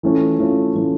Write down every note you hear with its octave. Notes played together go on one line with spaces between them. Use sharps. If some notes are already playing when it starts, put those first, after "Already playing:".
E3 A3 C#4 F4
E3 A3 C#4 F4
E3 A3 C#4 F4